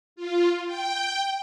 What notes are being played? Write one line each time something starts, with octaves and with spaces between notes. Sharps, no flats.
F4
G5